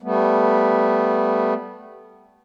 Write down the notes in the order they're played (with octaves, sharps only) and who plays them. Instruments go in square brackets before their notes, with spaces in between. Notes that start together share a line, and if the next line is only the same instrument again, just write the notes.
[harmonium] G3 A3 B3